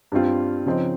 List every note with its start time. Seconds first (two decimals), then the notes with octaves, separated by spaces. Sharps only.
0.12 G2 G3 C4 F4
0.66 C#3 F3 C4 D#4